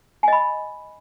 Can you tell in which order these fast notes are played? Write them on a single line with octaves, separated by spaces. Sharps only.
G#5 D#5 B5